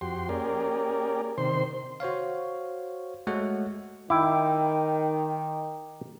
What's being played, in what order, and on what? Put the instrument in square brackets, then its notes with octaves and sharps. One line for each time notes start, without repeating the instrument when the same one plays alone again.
[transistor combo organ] F2 F#4 G4 C6
A#3 C#4 G4 G#4 A#4 D5
C3 D#3 C5 C6
[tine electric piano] F#4 C5 C#5 F5
G#3 A3 F#4 A4 C#5 F#5
[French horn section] D#3 [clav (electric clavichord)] E4 [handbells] G5 D6